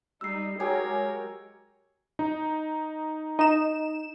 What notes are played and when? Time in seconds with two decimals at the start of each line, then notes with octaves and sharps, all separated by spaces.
0.21 G3 D#4 E6 C7
0.60 F#3 G#3 G4 G#4 A#4 C#5
2.19 D#4
3.39 D#4 E7